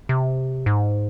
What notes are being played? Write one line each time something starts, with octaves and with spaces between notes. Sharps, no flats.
C3
G#2